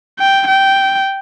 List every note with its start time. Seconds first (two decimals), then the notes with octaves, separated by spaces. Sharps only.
0.19 G5
0.48 G5